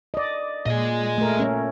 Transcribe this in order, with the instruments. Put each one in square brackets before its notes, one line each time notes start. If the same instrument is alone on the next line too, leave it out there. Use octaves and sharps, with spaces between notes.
[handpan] D5 D#5
[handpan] A#2 [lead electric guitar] G#4 D#5
[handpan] A3 A#4
C#4